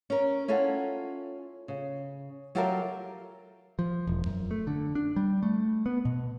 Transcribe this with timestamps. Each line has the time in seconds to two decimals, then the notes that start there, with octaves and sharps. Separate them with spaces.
0.10 C#4 A#4
0.48 C#4 E4 F4 A4 F#5
1.68 C#3
2.55 F#3 F4 G4 A4 A#4 E5
3.79 F3
4.07 E1
4.26 F#2
4.51 A3
4.67 D3
4.95 D4
5.16 G3
5.43 A3
5.86 B3
6.05 B2